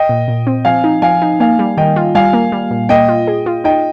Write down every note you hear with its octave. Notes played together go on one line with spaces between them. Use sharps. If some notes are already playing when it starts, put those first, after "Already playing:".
Already playing: D#5 G5
A#2
A#2
C4
F3 F5 G#5
D#4
F3 F5 G#5
D#4
A#3 F5 G#5
G3
D#3 D#5 G5
F4
G3 F5 G#5
A#3
G3
A#2
A#3 D#5 G5
F4
G#4
F4
D#4 D#5 G5